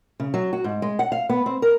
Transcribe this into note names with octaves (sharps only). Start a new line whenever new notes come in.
C#3
F#3
F#4
G#2
G#3
F#5
F5
B3
C4
A#4